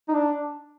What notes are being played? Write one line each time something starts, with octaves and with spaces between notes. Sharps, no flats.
D#4
D4